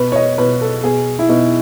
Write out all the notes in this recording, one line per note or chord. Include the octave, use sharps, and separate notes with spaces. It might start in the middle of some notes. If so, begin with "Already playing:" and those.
Already playing: B2 B4
C#5
D#5
B2 B4
A4
B2 G#4
E4
B2 D#4